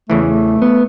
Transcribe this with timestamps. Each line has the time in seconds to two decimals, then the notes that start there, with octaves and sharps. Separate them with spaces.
0.10 E2 C#3 E3 A3
0.25 A3
0.62 B3